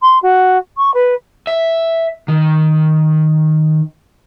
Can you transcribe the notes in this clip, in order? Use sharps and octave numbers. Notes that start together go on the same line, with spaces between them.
C6
F#4
C#6
B4
E5
D#3